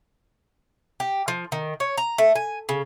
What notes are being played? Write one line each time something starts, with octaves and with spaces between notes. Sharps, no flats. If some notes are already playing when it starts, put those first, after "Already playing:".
G4
F3
D#3
C#5
A#5
A3
G#5
C#3